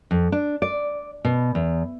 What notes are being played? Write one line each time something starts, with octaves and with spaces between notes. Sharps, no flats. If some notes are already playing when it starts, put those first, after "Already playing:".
F2
D4
D5
B2
E2